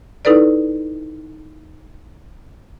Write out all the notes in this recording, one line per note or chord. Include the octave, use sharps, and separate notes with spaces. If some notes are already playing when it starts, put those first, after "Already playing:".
D#4 E4 A4 B4 D5